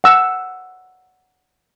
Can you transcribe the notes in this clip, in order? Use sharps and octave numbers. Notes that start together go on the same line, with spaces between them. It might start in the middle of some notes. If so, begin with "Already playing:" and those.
F#5 E6